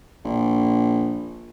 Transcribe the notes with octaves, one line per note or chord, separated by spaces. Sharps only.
A#1